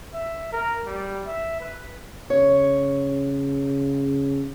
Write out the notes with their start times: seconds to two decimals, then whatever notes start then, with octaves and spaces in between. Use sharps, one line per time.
0.14 E5
0.52 A#4
0.86 G3
1.27 E5
1.60 B4
2.30 C#3 C#5